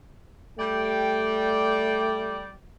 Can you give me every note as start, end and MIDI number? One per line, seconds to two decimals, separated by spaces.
0.58 2.50 55
0.58 2.46 57
0.58 2.50 74
0.58 2.50 79